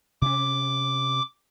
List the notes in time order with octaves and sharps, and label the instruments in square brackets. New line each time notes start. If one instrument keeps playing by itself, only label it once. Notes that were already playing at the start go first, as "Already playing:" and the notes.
[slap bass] C3 C#4 [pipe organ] D6